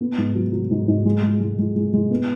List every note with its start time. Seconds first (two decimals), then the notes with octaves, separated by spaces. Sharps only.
0.01 B3
0.18 G#2
0.35 F#3
0.52 F#3
0.71 G#2
0.88 G#2
1.05 G#3
1.23 G#3
1.40 G#3
1.58 G#3
1.76 G#3
1.93 G#3
2.10 B3